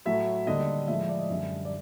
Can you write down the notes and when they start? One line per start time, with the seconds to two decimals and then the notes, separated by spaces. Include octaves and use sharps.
0.05 A2 F#3 A3 E5
0.47 D#2 D3 G3 D#5
0.88 A2 F3 G#3 E5
1.09 D5
1.19 D#5
1.29 F#2 D3 G3 E5
1.65 D5